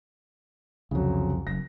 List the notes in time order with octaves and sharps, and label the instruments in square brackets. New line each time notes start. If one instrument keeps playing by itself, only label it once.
[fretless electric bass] C2 F2 [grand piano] C#3 F#3
[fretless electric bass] F#1 F#2 [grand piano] A#6